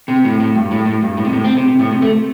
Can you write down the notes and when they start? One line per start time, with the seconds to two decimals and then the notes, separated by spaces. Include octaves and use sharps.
0.08 C3
0.25 A2
0.40 A2
0.55 G2
0.71 A2
0.86 A2
1.02 G2
1.17 A2
1.25 C3
1.33 A2
1.44 C4
1.56 C3
1.68 C3
1.79 A2
1.91 C3
2.02 A3